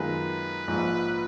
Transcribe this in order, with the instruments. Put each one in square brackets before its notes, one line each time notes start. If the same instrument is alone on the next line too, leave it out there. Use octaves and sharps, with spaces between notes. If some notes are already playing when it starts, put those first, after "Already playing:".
Already playing: [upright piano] F#2 D#3 G#3 B3 F4 [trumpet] B4
[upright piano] A#1 G#2 F3